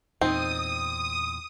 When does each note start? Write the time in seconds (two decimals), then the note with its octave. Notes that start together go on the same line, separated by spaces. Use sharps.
0.21 E2 A#2 C4 D#4 D#6